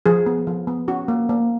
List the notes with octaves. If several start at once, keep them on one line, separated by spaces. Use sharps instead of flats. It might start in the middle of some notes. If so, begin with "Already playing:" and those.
F3 G#4
B3
F3
B3
C#4 F#4
A#3
A#3